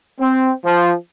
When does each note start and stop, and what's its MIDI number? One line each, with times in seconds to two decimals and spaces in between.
0.20 0.51 60
0.64 0.93 53